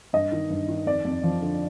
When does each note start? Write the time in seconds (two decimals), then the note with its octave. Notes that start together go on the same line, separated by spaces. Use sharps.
0.13 G2 D#5
0.32 D#3
0.50 G2
0.68 D#3
0.86 F2 D5
1.05 F2
1.23 F3
1.42 D3